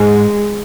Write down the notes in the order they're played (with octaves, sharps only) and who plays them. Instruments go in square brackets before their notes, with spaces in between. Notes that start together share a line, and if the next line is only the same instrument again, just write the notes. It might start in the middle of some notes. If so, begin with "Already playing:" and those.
Already playing: [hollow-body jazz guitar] G#2 [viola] G#3